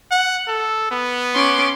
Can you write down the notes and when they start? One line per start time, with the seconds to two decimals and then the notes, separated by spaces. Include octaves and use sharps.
0.11 F#5
0.48 A4
0.91 B3
1.35 C#4 C6 D6